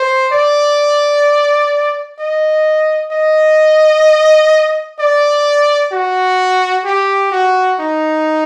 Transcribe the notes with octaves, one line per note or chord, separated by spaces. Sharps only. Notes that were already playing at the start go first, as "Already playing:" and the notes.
Already playing: C5
D5
D#5
D#5
D5
F#4
G4
F#4
D#4